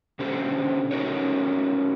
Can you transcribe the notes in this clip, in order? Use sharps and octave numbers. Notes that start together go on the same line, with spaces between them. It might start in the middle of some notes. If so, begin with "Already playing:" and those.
B2 D3 C#4 G4 A4 C5
C#4 D#4 F#4 A4 A#4 C#5